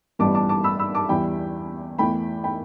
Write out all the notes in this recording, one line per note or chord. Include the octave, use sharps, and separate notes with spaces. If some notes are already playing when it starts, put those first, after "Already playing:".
A1 G2 E3 G3 B3 A5 D6
A5 D6
A5 D6
B5 E6
B5 E6
A5 D6
E2 E3 G3 G5 B5
E2 E3 A3 G5 B5
G5 B5